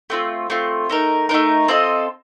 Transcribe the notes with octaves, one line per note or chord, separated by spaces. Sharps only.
A3 C4 F4
A3 C4 F4
A3 D#4 A#4
A3 D#4 A#4
C4 F4 A4 D#5